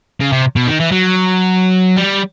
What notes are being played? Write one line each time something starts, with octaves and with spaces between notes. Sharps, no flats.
C#3
C3
B2
D#3
E3
F#3
G3